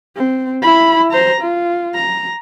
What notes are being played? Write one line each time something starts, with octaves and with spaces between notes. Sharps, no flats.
C4
E4 B5
C5 A#5
F4
A#5